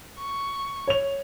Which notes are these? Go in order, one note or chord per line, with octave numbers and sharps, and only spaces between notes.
C#6
C#5 F7